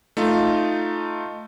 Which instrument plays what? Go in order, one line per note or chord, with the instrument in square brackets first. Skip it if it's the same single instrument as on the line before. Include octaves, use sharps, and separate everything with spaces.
[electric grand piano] A3 D#4 F4